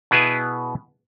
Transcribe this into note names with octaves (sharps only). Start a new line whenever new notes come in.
B2 B3 E4 G#4 B4 E5